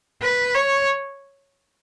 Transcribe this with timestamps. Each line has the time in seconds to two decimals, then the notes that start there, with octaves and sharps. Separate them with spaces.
0.22 B4
0.55 C#5